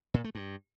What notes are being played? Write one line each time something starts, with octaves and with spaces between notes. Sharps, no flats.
A#2
A3
G2